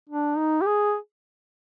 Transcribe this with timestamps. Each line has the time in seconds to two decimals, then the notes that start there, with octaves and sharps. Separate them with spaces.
0.09 D4
0.38 D#4
0.61 G4
0.66 G#4